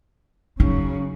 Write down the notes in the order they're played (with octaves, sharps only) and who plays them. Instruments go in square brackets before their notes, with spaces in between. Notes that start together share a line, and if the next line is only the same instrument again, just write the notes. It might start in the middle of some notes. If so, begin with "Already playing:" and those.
[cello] C#3 F#3 [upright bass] D#4